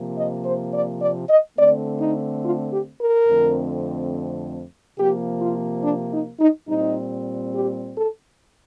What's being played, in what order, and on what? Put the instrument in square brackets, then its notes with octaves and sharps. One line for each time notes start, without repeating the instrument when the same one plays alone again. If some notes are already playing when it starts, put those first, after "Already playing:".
Already playing: [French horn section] C3 F3 A#3
D#5
C5
D5
D5
D#5
D3 A3 C4 D5
D#4
F4
G4
A#4
F2 D3 A3 C4
C3 F3 A#3 G4
F4
D4
D#4
D#4
A#2 G3 C4 D#4
G4
A4